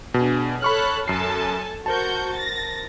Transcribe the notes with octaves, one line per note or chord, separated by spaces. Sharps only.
B2 D4 G#4
A4 C#5 B5 C#6 F6 F#6
F#2 A4 G#5 A5 C7
F#4 A#4 C5 A5 C#6 G6
A6 A#6